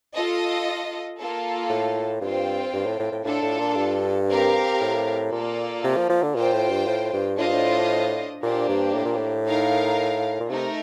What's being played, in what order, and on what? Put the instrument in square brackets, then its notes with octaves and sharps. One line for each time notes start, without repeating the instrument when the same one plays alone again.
[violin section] F4 A4 D#5
A#3 F4 A4
[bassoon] A2
[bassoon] G2 [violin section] C4 F4 C5 G5
[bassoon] G2
A2
A2
A2
[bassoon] A2 [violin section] D4 F4 A4
[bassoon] A2
A#2
G2
[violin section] C4 G4 A#4 F5
[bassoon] A2
[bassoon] A#2 [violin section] A#3 F4 A4 D5
[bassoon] C3
F3
F3
D3
[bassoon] A#2 [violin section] F4 C5 G5
[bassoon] A2
G2
A2
G2
[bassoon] A2 [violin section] D4 F4 C5 D#5
[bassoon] G2
A2
[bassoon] A#2 [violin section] A#3 D4 G4 C5
[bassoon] G2
A2
A#2
A2
[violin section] D#4 A#4 F5
[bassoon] A#2
[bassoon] C3 [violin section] A3 D#4 A#4